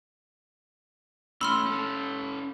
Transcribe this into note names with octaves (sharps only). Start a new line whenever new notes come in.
A3 C#4 B5 C6 E6 F6
C#4 A4